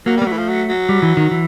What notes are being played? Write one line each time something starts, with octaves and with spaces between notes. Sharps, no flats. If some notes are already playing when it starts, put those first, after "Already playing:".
F#3 A#3
G3
A#3
F#3 A3
E3
F3
F#3
F#3
G3
E3
D#3
E3